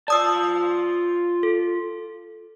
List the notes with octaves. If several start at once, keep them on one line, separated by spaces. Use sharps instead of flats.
F4 D5 A5 D#6 E6
A4